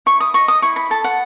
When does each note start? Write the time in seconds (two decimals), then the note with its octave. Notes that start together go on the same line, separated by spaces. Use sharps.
0.06 E4 C#6
0.20 D#6
0.34 D#5 C#6
0.48 D#6
0.62 E4 C#6
0.76 B5
0.90 A4 A5
1.04 F#5